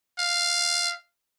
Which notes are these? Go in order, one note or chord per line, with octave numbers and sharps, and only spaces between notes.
F5